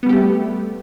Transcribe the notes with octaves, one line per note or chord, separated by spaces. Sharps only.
G3 A3 B3 G4